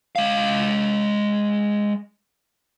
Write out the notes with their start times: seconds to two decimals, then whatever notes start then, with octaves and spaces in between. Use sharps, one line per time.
0.16 G#3 F5